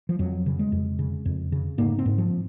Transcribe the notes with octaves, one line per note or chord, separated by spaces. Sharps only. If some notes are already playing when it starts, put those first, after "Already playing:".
F3
F2 F#3
C#3
G#3
F2
C#3
F2
C#3
G#2 A#3
C4
G#2
F3